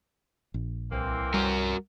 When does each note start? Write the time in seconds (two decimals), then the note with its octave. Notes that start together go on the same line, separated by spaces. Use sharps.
0.54 A#1
0.91 C2 E3 A#3 C4
1.34 G3 F#4 A#4